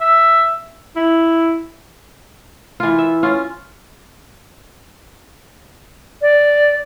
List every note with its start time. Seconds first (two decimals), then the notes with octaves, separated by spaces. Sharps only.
0.01 E5
0.96 E4
2.80 E3 F4
2.98 E5
3.23 C#4 F4
6.22 D5